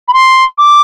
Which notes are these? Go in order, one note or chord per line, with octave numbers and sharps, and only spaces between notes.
B5
C6
D6